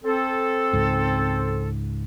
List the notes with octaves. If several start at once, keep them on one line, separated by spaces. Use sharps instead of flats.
C4 A4
C#2 G#2